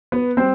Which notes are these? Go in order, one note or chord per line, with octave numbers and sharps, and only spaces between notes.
B3 B4
G3 C4 C5